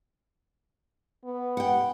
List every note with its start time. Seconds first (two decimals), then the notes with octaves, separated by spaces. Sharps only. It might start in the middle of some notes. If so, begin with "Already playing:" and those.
1.24 B3
1.57 F#5 G5